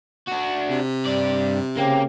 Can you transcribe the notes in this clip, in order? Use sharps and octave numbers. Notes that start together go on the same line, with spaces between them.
D4 F#4
C3
G2 D5
C#3 A#3 C4 G4